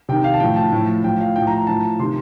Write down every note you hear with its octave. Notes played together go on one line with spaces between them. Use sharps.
C3 D#3 G5
F5
A5
A2 F3 G5
A5
A2 F3
A2 F3 G5
F5
A2 F3 G5
A#5
A#5
A2 F3 A5
C3 D#3 C6